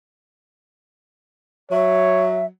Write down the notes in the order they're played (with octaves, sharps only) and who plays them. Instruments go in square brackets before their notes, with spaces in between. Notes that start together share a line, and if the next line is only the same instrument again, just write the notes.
[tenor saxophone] F#3 [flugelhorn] C#5 [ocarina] E5